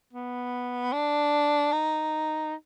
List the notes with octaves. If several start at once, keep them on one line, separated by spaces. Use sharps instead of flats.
B3
D4
D#4